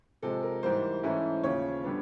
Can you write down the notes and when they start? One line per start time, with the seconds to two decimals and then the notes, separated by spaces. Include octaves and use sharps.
0.22 C3 F3 G#3 A4
0.43 A#4
0.62 G#2 E3 G3 A#3 C5
1.03 G#2 E3 A3 C#4 E4
1.43 D#2 C#3 F3 C#5
1.84 D3 G3 B3 D4